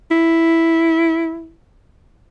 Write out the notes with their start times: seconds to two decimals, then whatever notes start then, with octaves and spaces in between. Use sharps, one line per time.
0.11 E4